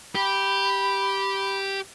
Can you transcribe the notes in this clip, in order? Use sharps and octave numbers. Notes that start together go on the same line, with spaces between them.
G4 B5